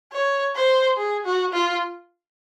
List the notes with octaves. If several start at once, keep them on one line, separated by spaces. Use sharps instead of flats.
C#5
C5
G#4
F#4
F4